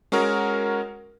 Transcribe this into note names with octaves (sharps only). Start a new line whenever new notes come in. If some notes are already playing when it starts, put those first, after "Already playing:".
G#3 C#4 F#4 A#4